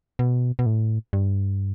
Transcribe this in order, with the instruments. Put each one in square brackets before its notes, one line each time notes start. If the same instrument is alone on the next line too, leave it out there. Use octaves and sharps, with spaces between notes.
[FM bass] B2
B2
A2
G2